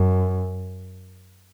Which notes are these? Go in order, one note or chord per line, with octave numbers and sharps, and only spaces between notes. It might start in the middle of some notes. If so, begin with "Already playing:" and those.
Already playing: F#2